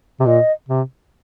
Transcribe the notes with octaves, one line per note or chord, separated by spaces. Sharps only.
C3
A#2 D#5
C3